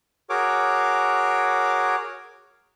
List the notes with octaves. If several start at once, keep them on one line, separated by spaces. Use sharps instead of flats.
F#4 G#4 A#4 C#5 D6